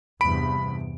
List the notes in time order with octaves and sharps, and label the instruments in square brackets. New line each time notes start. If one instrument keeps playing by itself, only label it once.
[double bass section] E2 G2 C3 [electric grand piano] B5 D7